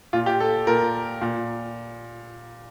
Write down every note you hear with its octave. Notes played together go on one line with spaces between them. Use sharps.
A#2 F4
G4
A4
A#2 A#4
A#2